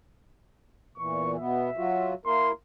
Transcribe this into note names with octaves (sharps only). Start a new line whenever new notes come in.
E2 A#2 E3 C#6
B2 B3 E5
F#3 F4 F#4
A#3 E4 A#4 C6